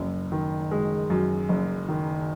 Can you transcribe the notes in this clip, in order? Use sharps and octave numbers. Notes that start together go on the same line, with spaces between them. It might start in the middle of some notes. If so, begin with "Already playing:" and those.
Already playing: F#1 F#2
D#3
G#3
F#2
F#1
D#3